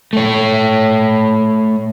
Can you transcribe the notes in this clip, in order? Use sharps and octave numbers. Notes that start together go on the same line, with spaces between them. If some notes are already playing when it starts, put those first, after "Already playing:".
A3 C#5